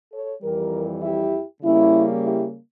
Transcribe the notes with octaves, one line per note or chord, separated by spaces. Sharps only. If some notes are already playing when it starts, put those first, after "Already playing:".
A4 C#5
F2 E3 G3 G4 A#4
E4 G4
C#3 G3 A#3 C#4 E4
E4 G4